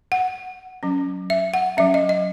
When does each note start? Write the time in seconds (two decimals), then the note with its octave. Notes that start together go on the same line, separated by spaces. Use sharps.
0.12 F#5
0.83 F#3 C#4
1.30 E5
1.54 F#5
1.77 F#3 C#4 E5
1.94 D#5
2.09 D#5